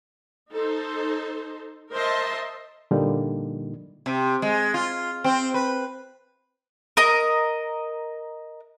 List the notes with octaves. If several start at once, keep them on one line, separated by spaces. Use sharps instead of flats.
D#4 A4 C5
A#4 C5 D#5 E5 A5 C6
A#2 D3 F3 G3 A#3 D#4
C3
G#3
F4
C4
B4
A#4 D#5